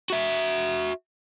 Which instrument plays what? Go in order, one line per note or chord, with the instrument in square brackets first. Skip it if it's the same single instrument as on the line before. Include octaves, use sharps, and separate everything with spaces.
[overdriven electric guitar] F#4 E5